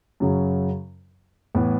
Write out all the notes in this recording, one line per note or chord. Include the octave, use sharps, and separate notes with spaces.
F#2 C#3 F#3
A2 E3 B3